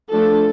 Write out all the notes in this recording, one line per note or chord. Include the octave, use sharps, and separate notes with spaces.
F3 A3 D4 A4